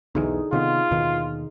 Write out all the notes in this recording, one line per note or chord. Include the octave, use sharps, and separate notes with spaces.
B1 E2 D3 D#4 G#4
C3 D#3 B3 F4
D#2 B2 D#3